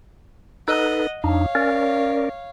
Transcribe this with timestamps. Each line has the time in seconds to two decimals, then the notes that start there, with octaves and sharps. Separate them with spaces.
0.68 D#4 A4 B4 D#5 F#5
1.24 F2 D4 D#4 C#5 F5
1.55 C#4 A#4 D5